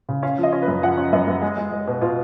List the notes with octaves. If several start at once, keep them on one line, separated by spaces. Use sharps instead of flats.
C#3
C#4 F5
F3 D#5
C#4
B4
F#2
F3 F#5
C#4
F#2 D#5
F#2
G#3
G#3
G#3
B2
B2 F4